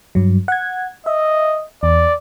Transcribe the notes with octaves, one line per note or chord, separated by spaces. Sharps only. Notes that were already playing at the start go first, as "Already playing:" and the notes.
G2 F#3
F#5 G#6
D#5 E5
E2 D5